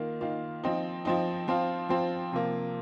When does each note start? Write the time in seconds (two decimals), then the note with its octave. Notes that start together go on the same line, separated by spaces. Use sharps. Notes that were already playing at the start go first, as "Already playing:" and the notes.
Already playing: D#3 A#3 F4
0.21 D#3 A#3 F4
0.64 F3 C4 D#4
1.05 F3 C4 D#4
1.48 F3 C4 F4
1.89 F3 C4 F4
2.33 C3 F3 A#3